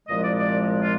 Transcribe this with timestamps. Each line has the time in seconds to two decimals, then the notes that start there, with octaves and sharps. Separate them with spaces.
0.08 C2 A#2 F3 G#3 D#5
0.23 D5
0.37 D5
0.82 F4